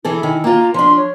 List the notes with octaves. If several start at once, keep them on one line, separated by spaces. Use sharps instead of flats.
E3 E4 G#4 A4
D#3
A#3 F4 A#5
F3 D4 C6
C#5